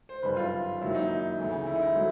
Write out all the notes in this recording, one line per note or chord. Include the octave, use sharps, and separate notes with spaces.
C5
G1 F#2 D#3 G3 B4
F4
F#2 D#3 F#3 A#3 E4
D#4
D2 C#3 E3
E4
D#4
E4
D3 F#3